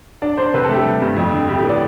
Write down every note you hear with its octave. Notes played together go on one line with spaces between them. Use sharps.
D4 D5
D4 C5
C3 B4
A4
A3
G4
G3
G2
F2
D3
A2 G4
G4
B3 D5